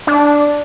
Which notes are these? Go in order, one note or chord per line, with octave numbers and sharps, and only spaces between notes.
D4